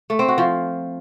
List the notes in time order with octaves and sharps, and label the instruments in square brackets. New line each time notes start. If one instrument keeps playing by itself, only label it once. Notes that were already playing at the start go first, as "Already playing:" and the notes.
[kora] A3
C4
F#4
F3